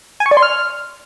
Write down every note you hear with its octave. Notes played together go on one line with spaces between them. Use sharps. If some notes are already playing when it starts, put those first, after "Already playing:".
G#5
C#6
D5
C6
F6